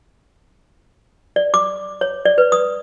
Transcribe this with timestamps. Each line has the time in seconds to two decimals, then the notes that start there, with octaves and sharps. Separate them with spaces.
1.36 D5
1.54 D6
2.01 C#5
2.25 D5
2.38 B4
2.52 D#6